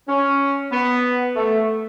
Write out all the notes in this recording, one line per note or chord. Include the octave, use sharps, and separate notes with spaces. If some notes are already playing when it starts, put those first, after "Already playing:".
C#4
B3
A3